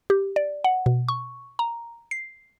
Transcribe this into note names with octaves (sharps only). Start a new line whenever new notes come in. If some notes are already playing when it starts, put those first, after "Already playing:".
G4
D5
F#5
B2
C#6
A#5
C7